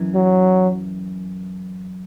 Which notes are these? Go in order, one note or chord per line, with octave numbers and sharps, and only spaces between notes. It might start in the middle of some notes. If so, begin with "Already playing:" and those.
Already playing: F#2 E3
F#3